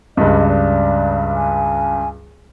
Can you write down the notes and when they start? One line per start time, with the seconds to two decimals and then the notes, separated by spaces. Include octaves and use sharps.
0.17 C#2 G2 D#5
0.49 D5
1.36 G#5